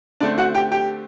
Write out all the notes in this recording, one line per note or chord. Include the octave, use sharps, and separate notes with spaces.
D3 A3 C4 D4 D5
F#4 F#5
G4 G5
G4 G5